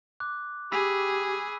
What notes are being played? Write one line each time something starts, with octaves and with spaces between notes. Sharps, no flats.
D6 F#6
G4 G#4 B5 E6 B6